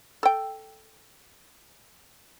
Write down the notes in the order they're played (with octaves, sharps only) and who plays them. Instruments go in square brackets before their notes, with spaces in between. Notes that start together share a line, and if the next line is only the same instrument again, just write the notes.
[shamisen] A4 G5